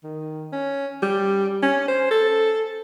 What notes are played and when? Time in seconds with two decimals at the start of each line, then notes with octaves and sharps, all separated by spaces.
0.03 D#3
0.52 C#4
1.03 G3
1.63 C#4
1.88 C5
2.11 A4